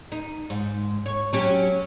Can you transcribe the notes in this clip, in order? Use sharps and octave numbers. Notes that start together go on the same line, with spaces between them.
D#4
G#2
C#5
F#3 C#4 G4